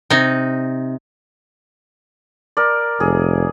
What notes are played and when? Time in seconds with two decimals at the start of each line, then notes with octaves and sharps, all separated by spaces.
0.10 C3 D#4
2.57 A#4 D5
3.00 F1 G#4